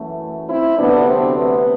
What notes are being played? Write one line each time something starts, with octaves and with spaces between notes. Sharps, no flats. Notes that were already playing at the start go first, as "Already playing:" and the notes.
Already playing: F#2 E3 A3
C4 E4
D2 C3 F#3 A3 B3 D4
C4
B3